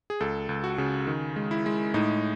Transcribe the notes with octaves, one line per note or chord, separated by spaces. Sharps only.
G#4
C#2 A4
C#2
F#4
C#3
D#3
G#3
E4
G#3
A2 D#4